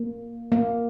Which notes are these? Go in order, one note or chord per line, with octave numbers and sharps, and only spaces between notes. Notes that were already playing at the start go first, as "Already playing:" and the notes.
Already playing: A#3
A#3